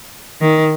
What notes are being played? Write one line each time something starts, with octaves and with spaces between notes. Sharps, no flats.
D#3